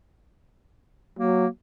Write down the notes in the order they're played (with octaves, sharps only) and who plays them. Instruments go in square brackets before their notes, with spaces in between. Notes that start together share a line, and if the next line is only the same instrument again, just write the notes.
[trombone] F#3 [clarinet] A#3